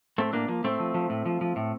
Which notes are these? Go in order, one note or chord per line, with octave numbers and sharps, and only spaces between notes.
A2 A3 C4
A2 A#3 D4
F3 A#3
A2 A3 C4
F3
F3
A2
F3
F3
A2